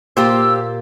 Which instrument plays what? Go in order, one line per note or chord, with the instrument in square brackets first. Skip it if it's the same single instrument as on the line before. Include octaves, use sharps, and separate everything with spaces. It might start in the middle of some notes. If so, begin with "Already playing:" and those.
[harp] A#2 [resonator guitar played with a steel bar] F4 G4 C5 [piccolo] E6